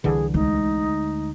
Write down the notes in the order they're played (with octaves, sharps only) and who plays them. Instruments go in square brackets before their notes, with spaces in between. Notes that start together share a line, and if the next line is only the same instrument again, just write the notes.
[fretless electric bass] C2 D3 E3 [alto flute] G#4
[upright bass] D2 G#3 [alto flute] D#4